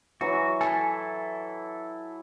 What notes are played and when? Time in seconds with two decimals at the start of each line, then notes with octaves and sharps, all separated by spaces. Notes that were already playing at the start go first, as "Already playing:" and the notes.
0.21 E3 F#3 F#4
0.61 E4 A4 G#5